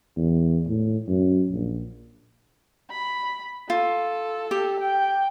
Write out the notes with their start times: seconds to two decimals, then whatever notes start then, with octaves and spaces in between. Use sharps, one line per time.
0.17 E2
0.68 A2
1.08 F#2
1.50 A#1
2.91 B5
3.70 F4 A4
4.51 G4
4.81 G5